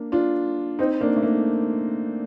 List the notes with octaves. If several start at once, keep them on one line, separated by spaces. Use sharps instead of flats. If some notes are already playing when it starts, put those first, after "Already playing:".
Already playing: A#3 D4
D4 F4
C4 D#4
A#3 D4
A3
A#3